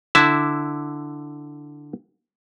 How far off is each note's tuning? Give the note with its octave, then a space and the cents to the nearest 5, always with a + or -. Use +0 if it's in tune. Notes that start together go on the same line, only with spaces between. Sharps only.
D3 +0 E4 +0 A5 -15